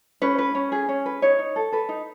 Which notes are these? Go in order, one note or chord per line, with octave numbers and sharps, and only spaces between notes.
C#4 B4
B4
C#4
G#4
C#4
B4
D#4 C#5
D#4
A4
A4 B4
D#4